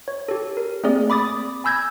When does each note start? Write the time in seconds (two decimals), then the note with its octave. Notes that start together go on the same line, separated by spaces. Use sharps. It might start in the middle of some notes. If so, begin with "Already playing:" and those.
0.08 C#5
0.28 G4 A4
0.57 A#4
0.84 A3 A#3 C4 G#4 D5
1.10 B5 D6 D#6 A6
1.64 G#5 B5 E6 G6 G#6 A#6